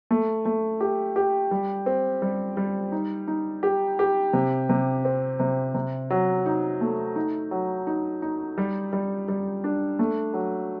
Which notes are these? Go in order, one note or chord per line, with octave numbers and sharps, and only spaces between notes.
A3
A3
G4
G4
G3
C4
G3
G3
D#4
D#4
G4
G4
C3
C3
C4
C3
C3
F#3
D#4
A3
D#4
F#3
D#4
D#4
G3
G3
G3
D4
A3
F#3